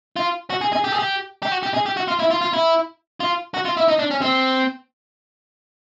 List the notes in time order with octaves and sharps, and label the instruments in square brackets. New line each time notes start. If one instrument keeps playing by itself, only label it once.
[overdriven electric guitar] F4
F#4
G#4
G#4
G4
G#4
G4
G4
F#4
G4
G#4
G4
F#4
F4
E4
F4
F4
E4
F4
F#4
F4
E4
D#4
D4
C#4
C4